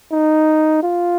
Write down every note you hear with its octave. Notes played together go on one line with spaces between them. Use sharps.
D#4
F4